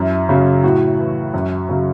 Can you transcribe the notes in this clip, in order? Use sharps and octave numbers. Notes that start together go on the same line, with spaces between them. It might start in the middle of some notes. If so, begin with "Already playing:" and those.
Already playing: F#2 E4
C#3 F#3
A2 F#4
E3
F#2
C#3 F#3